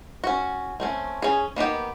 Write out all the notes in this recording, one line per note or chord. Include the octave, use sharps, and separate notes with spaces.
C#4 F#4
A3 C4 C#4
C#4 G#4
A#3 B3 D#4 G4